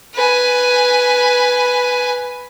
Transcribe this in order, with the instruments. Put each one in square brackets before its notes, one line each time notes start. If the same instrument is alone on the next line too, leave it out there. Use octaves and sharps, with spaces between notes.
[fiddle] B4 G#5